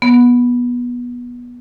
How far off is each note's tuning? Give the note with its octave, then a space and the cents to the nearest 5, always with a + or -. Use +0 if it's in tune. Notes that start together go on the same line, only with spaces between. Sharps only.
B3 -20